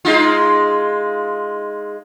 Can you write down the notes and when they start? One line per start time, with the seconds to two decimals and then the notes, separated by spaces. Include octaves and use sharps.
0.05 G#3 D#4 F4